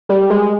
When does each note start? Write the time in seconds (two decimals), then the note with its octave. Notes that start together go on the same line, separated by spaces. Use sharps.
0.09 G3
0.30 G#3